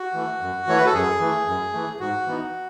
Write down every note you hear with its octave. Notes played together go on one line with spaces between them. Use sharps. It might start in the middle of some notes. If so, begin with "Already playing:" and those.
Already playing: F#4
E3 A3
F#2
E3 A3 C#5
B4
A4
F#2 G#4
E3 A3
F#2
E3 A3
G#2 F#4
E3 B3 D#4